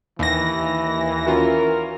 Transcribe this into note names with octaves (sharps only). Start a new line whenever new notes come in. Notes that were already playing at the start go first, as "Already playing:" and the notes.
D#2 E3 A#6
C#4 F4 F#4 A#4